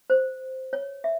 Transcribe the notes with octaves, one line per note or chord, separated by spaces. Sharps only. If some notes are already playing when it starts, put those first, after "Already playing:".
C5
C#5
E5